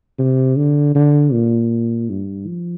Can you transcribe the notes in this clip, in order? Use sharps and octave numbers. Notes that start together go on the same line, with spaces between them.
C3
D3
D3
A#2
G2
F3